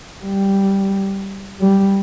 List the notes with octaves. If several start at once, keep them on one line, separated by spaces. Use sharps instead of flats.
G3
G3